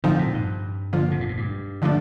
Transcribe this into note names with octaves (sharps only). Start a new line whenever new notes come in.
A2 D3 F3 C4 D#4
A#2
G2
D3 F3 A#3 F4
C3
A#2
A2
G2
D3 F3 A3 D4